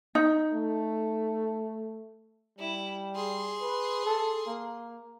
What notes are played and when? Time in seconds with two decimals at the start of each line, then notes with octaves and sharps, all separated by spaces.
0.15 D#4
0.53 A3
2.59 G3 E4
3.15 G#4 C6
3.62 B4
4.05 A4
4.47 A#3